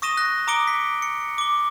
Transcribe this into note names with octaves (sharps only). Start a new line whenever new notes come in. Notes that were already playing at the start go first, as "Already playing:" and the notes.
C#6 D#6 A#6 D#7 E7 G7
F#6 A#6
A#5 D6 D#6 C#7 D7 G7
B6
C#7
D6 G7